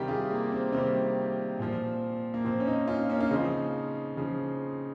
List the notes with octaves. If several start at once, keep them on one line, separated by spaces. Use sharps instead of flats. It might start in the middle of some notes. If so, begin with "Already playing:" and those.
Already playing: C3 D#3 G3 G4 A#4
F4 G#4
A#3
C4
C3 D#3 G3 C4
A#2 F3
A#3
A#2 F3 C4
C#4
C4 D#4
C#4 F4
A#3 C#4
F4
C#3 F3 C4 D#4
C#3 F3